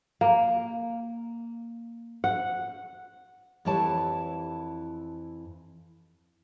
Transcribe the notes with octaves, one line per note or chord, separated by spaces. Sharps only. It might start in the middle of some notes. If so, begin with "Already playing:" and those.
A#3
F#5
F2 E3 E4 G4 C#5 A5